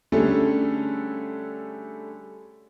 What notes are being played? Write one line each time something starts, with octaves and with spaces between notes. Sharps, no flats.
D3 G3 A3 C#4 G#4 A4